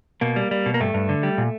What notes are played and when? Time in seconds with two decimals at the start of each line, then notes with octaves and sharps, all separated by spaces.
0.21 B2 A#3
0.36 G3
0.51 G3
0.66 B2
0.74 A#3
0.80 G2 A3
0.94 G2
1.09 D3
1.23 G3
1.38 A#2